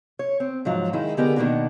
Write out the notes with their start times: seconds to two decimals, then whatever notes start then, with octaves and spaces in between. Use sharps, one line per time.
0.19 C#5
0.40 C4
0.65 G#2 F3 F#3
0.93 D#3 G#3 D#4 E4
1.17 D3 B3 G4 G#4 A#4 D#5
1.36 B2 D#3 F3 A#3 D4 F#4